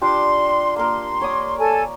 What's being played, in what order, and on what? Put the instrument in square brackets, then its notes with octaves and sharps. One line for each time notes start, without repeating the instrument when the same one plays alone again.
[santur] D4 F4 G4 [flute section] C6
[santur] A#3 A#4 [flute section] C6
[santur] C#5 D5 D#6
[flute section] A4 G#5